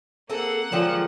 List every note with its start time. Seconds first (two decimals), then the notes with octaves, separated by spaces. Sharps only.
0.30 A#3 C4 G#4 A4 F#5
0.72 D3 F3 F#3 G#3 D5 G5 E7